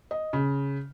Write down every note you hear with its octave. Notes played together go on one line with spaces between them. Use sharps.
D#5
C#3